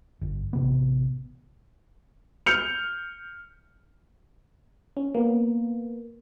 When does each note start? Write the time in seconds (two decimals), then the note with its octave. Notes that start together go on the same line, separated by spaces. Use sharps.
0.21 G1
0.53 A1 C3 B3
2.46 F6 G6 C#7 F7
4.97 C#4
5.15 A#3 B3